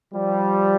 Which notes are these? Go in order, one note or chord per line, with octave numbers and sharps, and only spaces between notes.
F3 G3